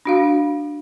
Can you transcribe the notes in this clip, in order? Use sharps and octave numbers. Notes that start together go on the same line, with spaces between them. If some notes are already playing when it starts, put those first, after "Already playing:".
D4 F#4 F5